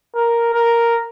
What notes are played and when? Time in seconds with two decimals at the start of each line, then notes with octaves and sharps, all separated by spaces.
0.15 A#4
0.54 A#4